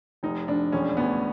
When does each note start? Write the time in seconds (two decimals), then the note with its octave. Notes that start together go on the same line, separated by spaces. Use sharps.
0.23 F1 D#4
0.48 F1 D4
0.72 E1 C#4
0.97 D2 B3